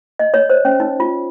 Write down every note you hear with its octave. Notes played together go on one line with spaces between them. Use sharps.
D#5
C#5
C5
C#4
D#4
F4